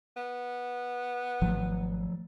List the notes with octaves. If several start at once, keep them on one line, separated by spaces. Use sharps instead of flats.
B3
G#1 D#3 F3 F#3 A3